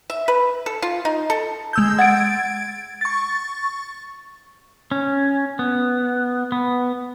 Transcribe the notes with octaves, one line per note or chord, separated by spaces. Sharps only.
E5
B4
A4
F4
D#4
A4
G#3 E6 G6
F#5 G#6 A6 D7
C#6 A6
C#4
B3
B3